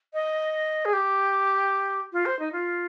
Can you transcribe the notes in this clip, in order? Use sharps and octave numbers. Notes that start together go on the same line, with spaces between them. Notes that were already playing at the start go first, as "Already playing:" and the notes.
D#5
G#4
G4
F4
C5
D#4
F4